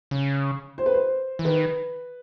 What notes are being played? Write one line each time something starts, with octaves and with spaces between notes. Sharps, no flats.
C#3
C5
B4
C5
E3
D#3 B4